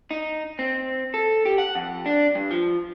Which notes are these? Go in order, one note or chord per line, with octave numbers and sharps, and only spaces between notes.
D#4
C4
A4
G4
F#5
F2
D4
G2
F3